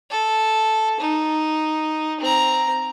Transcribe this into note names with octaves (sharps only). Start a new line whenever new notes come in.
A4
D#4
C4 A#5